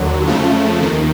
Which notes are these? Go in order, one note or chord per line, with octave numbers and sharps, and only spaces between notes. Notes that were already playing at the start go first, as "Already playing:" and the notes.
Already playing: D#2 D3 F#3
F2 C#3 F3 A3
D#2 D#3